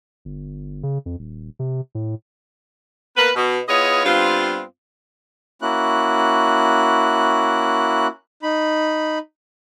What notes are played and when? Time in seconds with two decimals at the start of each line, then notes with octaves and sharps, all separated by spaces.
0.25 G1
0.83 C#3
1.06 F2
1.19 D#1
1.59 C3
1.95 A2
3.17 A#3 B3 A#4 B4
3.36 B2
3.68 B3 E4 F4 G#4 C#5 D#5
4.05 G2 B3 C4 F4
5.62 A#3 C#4 E4 F#4 F#6
8.43 D#4 B5